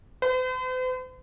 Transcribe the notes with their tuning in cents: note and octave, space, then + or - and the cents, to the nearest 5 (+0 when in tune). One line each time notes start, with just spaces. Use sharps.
C5 -45